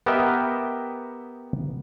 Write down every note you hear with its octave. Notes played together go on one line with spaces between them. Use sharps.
B3 G4 A#4 D#5 E5 G5